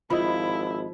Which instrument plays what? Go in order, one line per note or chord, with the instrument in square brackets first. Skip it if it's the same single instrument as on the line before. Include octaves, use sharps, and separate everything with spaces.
[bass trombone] G#1 [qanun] F3 [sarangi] E4 [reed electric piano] D#5 B5